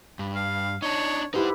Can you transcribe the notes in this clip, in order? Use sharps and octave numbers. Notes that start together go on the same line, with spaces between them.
G2
F5
D4 D#4 C#5
D#4 E4 G4 B4 C5